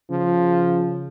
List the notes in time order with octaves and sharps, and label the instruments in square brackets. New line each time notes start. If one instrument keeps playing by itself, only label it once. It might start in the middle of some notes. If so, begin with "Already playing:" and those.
[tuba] C#3 [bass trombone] F3